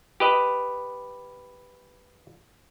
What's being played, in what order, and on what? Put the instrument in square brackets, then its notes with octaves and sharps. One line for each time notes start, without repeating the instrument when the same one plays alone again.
[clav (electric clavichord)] G4 B4 D#5